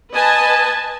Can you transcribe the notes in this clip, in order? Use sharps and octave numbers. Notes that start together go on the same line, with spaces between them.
B4 D#5 G#5 A5